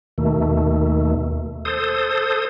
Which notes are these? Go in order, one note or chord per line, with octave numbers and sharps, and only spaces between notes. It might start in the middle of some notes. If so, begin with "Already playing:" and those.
D#2 B2 D#3 A3
A4 C5 D#6